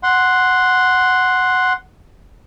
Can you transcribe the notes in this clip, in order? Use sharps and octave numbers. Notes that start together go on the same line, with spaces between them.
F#5 C6